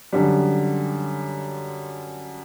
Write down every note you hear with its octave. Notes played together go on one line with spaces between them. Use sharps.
F#2 D3 G3